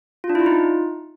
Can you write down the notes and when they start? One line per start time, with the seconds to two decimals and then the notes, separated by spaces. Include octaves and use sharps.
0.24 F4
0.30 D4
0.35 E4
0.41 F4
0.46 D#4